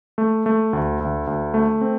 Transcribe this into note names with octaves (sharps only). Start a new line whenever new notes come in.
A3
A3
D2
D2
D2
A3
C4